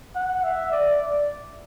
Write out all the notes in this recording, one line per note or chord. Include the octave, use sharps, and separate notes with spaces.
F#5
E5
D5